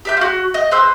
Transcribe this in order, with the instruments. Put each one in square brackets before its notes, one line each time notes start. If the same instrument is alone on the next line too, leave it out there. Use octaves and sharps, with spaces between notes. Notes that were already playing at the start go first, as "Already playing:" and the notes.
[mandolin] G4 E5 G6
F4 F#4
D#5
B4 C5 E6